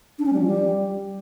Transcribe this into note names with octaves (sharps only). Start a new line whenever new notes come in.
D4
C#4
G3
F3
G3